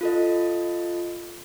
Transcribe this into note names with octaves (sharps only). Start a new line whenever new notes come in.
F4 A4 D#5